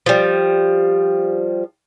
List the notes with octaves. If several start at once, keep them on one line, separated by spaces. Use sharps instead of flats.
F3 G3